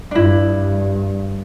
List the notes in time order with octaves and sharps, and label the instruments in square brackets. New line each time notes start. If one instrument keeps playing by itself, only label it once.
[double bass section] G2 [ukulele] D4 E4